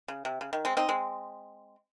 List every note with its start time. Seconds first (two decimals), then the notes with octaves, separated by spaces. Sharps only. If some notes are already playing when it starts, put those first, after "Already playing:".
0.08 C#3
0.25 C3
0.41 C#3
0.53 D#3
0.65 G#3 C4
0.77 C4 D#4
0.89 G#3 C4